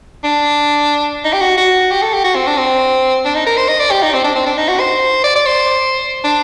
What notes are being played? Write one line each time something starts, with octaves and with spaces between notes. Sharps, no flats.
D4
D#4
G4
F#4
F#4
G4
A4
G4
F#4
C4
D4
C4
D4
D#4
A#4
C5
D#5
D5
G4
D#4
C4
D4
C4
D4
D#4
F#4
C5
D5
D5
C5
D4